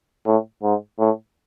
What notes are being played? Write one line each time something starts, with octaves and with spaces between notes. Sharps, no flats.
A2
G#2
A2